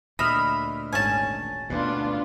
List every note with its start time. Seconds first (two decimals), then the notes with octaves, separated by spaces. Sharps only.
0.19 D2 A#2 D#5 E5 B5 F6
0.93 G#1 C#4 G#5 A5
1.70 D2 B2 B3 D4 F4